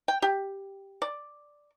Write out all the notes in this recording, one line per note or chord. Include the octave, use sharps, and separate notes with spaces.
G5
G4
D5